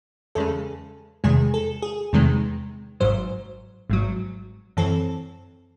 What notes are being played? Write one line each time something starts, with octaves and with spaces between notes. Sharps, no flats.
E2 C#3 G#3 A4
E2 C3 D#3 G#3 G#4
A4
G#4
E2 C3 D#3 G#3
G#1 G#2 F#3 C5
G#1 G#2 F#3
F#2 E3 C4 A4